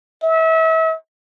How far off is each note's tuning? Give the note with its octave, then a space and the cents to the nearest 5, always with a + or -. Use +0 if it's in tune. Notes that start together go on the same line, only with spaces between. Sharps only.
E5 -35